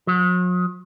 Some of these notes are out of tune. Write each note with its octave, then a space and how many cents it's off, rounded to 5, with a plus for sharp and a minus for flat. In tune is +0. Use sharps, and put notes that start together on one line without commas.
F#3 -45